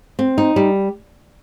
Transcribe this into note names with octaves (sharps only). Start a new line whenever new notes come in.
C4
D#4
G3